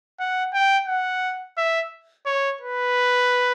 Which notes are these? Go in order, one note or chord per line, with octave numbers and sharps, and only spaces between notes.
F#5
G5
F#5
E5
C#5
B4